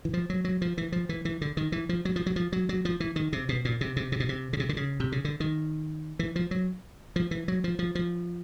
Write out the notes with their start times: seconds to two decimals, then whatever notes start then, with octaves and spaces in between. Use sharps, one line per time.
0.05 E3
0.14 F3
0.30 F#3
0.45 F#3
0.62 F3
0.78 E3
0.92 F3
1.09 E3
1.25 E3
1.41 D3
1.57 D#3
1.72 E3
1.89 F3
2.05 F#3
2.16 F3
2.26 F#3
2.36 F3
2.53 F#3
2.69 F#3
2.85 F3
3.00 E3
3.16 D#3
3.33 C3
3.49 B2
3.65 A#2
3.81 C3
3.96 C3
4.12 C3
4.20 B2
4.29 C3
4.53 C#3
4.60 C3
4.69 D3
4.77 C#3
5.00 C3
5.12 C#3
5.25 D3
5.40 D#3
6.19 E3
6.36 F3
6.51 F#3
7.16 F3
7.31 E3
7.48 F#3
7.64 F3
7.79 F3
7.95 F3